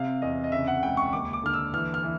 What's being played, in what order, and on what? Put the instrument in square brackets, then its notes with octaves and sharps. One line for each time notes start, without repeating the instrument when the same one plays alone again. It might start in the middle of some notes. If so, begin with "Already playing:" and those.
Already playing: [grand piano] C3 F5
E2 D#5
D#5
C#3 E5
F#5
C#2 G5
C#6
D#2 D6
D6
D3 F6
E6
E3 F6
F6
E3